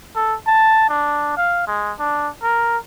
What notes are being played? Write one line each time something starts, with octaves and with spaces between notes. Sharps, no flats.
A4
A5
D4
F5
G#3
D4
A#4